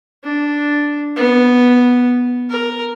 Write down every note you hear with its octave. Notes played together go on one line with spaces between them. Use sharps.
D4
B3
A#4